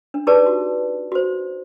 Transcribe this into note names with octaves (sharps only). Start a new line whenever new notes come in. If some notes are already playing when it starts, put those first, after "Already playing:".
D4
D#4 G4 G#4 B4 D5 A5
F#4
F#4 C5